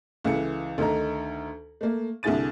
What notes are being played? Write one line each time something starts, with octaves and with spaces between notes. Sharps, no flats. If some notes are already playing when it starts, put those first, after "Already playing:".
C#2 E3 A4 C#7
D2 D#3 D#4 A4 A#5
A3 A#3
C2 D3 E4 G#4 A6 D#7